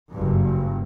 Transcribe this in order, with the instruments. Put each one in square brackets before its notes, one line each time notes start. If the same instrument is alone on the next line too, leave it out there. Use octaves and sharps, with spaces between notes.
[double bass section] F#1 G2